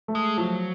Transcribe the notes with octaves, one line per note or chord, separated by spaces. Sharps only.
A3
G#3
F3 F#3